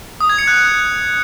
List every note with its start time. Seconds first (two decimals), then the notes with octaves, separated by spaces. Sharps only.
0.21 D#6
0.29 G#6
0.38 C#7
0.47 F#6